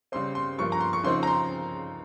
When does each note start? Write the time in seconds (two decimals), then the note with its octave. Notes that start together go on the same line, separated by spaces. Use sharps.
0.12 C#3 G3 C4 C6
0.35 C6
0.58 G2 F3 A#3 C#6
0.72 A#5
0.80 C6
0.93 C#6
1.03 C#3 F3 C4 D#4 C6
1.23 A#5
1.27 C6